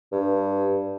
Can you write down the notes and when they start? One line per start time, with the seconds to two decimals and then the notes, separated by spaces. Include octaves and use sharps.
0.12 G2